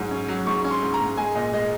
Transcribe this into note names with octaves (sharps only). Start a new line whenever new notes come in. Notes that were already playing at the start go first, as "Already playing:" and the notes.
Already playing: G#2 F#3
C#4
F#3
G#2 C#6
C#4
C6
G#2
A#5
G#2
G#3 G#5
A#2 D#5
G#3 D#5